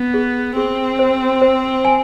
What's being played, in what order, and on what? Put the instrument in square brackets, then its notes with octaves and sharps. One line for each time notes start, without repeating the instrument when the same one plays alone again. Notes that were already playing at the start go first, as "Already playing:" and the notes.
Already playing: [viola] B3
[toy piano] G#4
[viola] C4 [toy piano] G#4
[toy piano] C5
C5
G#5